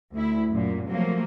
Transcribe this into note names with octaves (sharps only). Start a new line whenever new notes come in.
D2 E4
F#2 A#2
C3 F3 F#3 A3 A#3